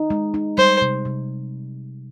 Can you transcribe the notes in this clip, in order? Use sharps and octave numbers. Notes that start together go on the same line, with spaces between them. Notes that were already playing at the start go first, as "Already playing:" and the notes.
Already playing: D#4
G#3
D#4
G3 C5
C3
C3